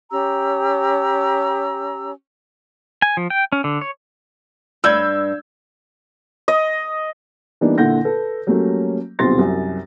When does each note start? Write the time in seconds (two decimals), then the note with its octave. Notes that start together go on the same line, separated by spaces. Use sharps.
0.11 C#4 G4 A#5 E6
3.02 G#5
3.17 F3
3.30 G5
3.52 C#4
3.64 D3
3.81 C#5
4.84 G2 E6 G6 G#6
6.48 D#5
7.61 E3 G3 A#3 B3 D4 D#4
7.78 A#2 D3 E4 F#5 G6 A#6
8.05 A4 B4
8.47 F#3 G3 A3 A#3 C#4
9.19 D#1 B1 C3 C6 A6 A#6
9.39 C2 F#2